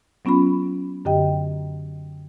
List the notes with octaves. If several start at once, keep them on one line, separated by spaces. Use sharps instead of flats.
F#3 B3 C#4 F4 B5
F#2 D3 G4 D#5 G5